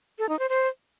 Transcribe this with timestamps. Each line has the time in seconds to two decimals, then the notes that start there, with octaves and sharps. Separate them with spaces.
0.19 A4
0.29 D#4
0.39 C5
0.49 C5